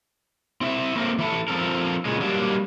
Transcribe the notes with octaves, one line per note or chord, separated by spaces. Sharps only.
C4 E4 E5
A3 A#3 C4 A#4
E3 E4 A4
F3 G3 C4 A4 A#4
A#2 C#3 G#3
F#3 G3 A#3 D4